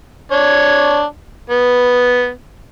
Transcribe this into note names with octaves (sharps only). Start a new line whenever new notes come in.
D4 C#5
B3